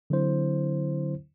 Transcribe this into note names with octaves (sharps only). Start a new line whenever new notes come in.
D3 F#3 C4 E4 C5